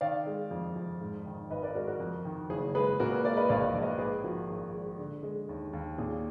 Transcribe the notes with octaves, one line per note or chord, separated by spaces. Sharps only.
D#3 D5 F5
G#3
F2
F2
G#2
D#3
G#1 B4 D#5
A#4 D5
G#3 F#4 A#4
F#4 A#4
F2
D#3
F#1 G#4
G#3 G#4 B4
A#2 F#4 A#4
G#4 B4
G#3 A#4 D5
B4 D#5
A#1 D5 F5
A#1 F5
B4 D#5
G#2 G#4 B4
F3 F#4 A#4
G#1 G#4
G#3
D3
G#3
D#2
D#2
A#2 G#4